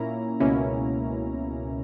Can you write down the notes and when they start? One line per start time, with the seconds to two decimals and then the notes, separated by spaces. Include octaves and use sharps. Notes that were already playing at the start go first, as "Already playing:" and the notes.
Already playing: A#2 A#3 C#4 E4 A#5
0.40 C#2 B2 A#3 C#4 E4